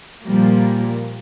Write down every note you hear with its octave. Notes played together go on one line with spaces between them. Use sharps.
A#2 F3 G3 A#3